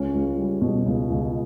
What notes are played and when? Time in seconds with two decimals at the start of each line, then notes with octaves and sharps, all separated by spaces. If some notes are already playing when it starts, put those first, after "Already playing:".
Already playing: C#2 C#4
0.14 C#2
0.38 G3
0.61 B2
0.86 C#2
1.10 C#2